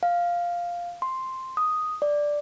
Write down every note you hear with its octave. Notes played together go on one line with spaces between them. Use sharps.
F5
C6
D#6
D5